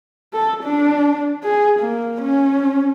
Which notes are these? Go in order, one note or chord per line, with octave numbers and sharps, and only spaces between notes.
A4
D4
G#4
A#3
C#4